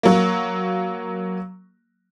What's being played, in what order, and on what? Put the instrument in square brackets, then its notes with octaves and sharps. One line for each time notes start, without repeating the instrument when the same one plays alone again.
[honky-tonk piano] F#3 A#3